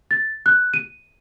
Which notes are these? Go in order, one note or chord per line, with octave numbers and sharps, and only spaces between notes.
A6
F#6
D#7